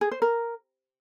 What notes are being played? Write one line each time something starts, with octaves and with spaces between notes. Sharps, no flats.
G#4
C5
A#4